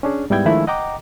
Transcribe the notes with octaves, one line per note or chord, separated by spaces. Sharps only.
C#4 D4 G#4
G#2 G3 B3 E4 G5 G#6
D#3 F3 G#3 A3 D4 E4
D#5 F#5 G5 A#5 D6